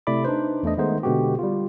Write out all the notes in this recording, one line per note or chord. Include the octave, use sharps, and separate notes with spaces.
C3 A3 E4 D5 B5 D6
D4 D#4 B4 C5
E2 A3 D4 D#5
D#3 G#3 A3 B3 D#4 C5
B2 D3 G#3 B3 F#4 G4
G3 F4